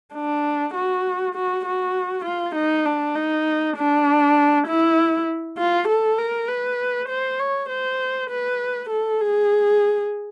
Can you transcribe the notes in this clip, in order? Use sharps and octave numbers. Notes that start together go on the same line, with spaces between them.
D4
F#4
F#4
F#4
F4
D#4
D4
D#4
D4
E4
F4
A4
A#4
B4
C5
C#5
C5
B4
A4
G#4